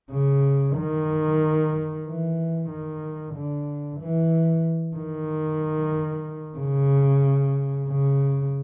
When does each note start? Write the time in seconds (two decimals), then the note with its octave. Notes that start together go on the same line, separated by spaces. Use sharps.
0.11 C#3
0.77 D#3
2.06 E3
2.70 D#3
3.34 D3
4.00 E3
4.96 D#3
6.57 C#3
7.88 C#3